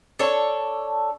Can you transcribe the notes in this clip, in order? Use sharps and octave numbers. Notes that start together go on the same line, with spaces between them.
D4 A4 C#5